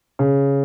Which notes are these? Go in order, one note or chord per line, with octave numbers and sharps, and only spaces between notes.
C#3